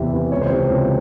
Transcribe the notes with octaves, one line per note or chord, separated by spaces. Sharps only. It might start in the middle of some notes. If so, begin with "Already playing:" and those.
Already playing: E2 C3 E3 E5
C3 E3
C#2 C#5
C5
C3 E3 C#5
C#2